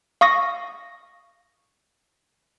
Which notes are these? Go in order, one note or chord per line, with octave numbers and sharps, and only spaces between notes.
F5 C#6 D#6 A#6